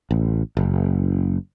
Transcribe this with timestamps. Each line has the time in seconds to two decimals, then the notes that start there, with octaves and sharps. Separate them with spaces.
0.11 A1
0.57 F#1